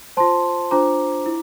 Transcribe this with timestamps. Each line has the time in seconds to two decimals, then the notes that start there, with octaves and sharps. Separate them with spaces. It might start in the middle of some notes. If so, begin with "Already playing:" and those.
0.17 F4 C5 A5 C6
0.71 D4 F4 C5 A#5 D6
1.26 E4